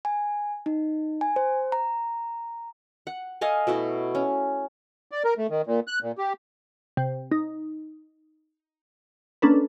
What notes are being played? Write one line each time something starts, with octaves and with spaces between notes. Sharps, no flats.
G#5
D#4
G#5
C5
A#5
F#5
A4 D#5 F5 G#5
B2 A3 E4 F#4
C#4
D5
A#4
A3
D#3
A#2
F#6
A#2
G4
C3
D#4
A#3 C#4 D4 A4 B4